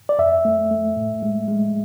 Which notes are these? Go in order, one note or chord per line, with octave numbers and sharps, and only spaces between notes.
D5
F2 E5
A3
A3
A2
G#3
G#3